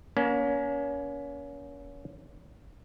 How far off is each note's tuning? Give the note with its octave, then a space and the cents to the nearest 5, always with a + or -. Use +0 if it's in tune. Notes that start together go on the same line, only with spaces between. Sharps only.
A#3 +35 C#4 +30